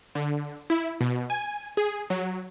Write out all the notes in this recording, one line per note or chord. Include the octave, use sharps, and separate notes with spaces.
D3
E4
B2
G#5
G#4
F#3